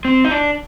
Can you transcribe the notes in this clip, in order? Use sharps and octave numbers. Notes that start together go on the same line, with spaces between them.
C4
D#4
D4